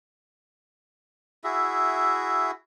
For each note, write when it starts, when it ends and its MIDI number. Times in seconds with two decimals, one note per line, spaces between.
1.44 2.51 64
1.44 2.51 66
1.44 2.51 68
1.44 2.51 76